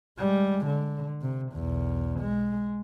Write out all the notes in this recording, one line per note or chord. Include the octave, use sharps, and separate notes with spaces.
G3 G#3
D3
C3
B1 E2
G#3